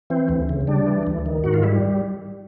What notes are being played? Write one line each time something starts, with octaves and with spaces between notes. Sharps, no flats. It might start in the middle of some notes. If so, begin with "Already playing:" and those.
E3 C4
D2
C#3
G3 D4
E3
D2
D#3
G#2 F#4
F4
G3 E4